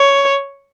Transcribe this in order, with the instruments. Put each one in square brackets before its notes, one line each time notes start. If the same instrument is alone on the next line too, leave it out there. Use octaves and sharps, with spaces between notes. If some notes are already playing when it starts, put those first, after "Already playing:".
Already playing: [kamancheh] C#5